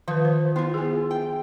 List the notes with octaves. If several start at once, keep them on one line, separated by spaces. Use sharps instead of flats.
D#3 F3 B4
C5
B3 E4 F4 C6
G#4 G#5
G5